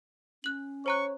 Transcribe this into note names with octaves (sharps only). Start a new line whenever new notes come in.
C#4 F#6 F#7
C5 C#5 A#5 C#6 F#6